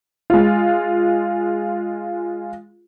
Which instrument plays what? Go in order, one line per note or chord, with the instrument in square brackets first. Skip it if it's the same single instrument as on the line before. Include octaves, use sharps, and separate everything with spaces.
[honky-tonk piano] G#3 F4